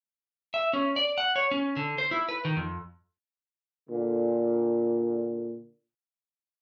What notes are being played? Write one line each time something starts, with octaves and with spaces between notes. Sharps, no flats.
E5
C#4
D5
F#5
C#5
C#4
D3
C5
E4
B4
D#3
F2
A#2 D3